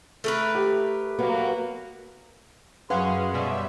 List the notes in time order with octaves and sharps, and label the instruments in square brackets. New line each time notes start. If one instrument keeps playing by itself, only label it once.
[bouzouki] A3 A#4 B4
[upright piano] G4
[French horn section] F#3 A#3 F#4 [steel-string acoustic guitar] B3
[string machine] F#2 [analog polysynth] C#4 [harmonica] G#4 C6 [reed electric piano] B4 F5 F#5
[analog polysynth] B2 G3 C#4 [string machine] E5